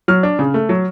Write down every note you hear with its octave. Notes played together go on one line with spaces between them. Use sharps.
F#3 F6
D4
C#3
A3
F#3